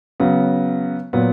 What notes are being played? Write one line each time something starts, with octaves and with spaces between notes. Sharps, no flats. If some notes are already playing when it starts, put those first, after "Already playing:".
C#3 F#3 B3
A#2 F#3 B3